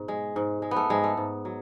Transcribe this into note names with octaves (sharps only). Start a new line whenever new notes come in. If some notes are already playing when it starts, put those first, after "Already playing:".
Already playing: G#2 B2
G#3
G#2
G#3
B3
A3
G#2 G#3
A3
G#2
F#3